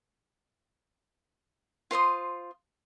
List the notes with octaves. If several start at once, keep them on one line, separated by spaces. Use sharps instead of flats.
F4 C5 C6 D#6